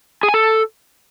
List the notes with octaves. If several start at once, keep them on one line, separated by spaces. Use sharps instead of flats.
G#4
G#5
A4